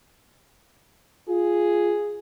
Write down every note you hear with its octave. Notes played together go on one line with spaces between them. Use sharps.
F4 G#4